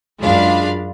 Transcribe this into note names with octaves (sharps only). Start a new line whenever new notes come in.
F#2 G#3 D4 F4 F5 B5